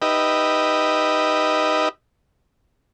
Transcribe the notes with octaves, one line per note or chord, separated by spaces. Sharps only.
D#4 G4 B4 D#5 E5